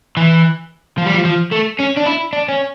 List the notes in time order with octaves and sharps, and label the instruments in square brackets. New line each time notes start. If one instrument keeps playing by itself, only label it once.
[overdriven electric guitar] E3
F3
G3
F3
F3
A3
C#4
D4
E4
D4
C#4